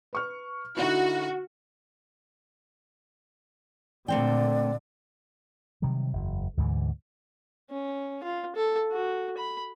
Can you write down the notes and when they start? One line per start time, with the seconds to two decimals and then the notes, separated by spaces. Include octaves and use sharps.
0.13 B4 C#6 F6
0.77 D3 D#4 E4 F#4
4.08 A#2 D3 A3 C4 D5 G5
5.82 C3 D#3 F#3 G3
6.13 F#1 E2
6.57 D2 G#2 D3 E3
7.71 C#4
8.23 F4
8.56 A4
8.92 F#4
9.38 B5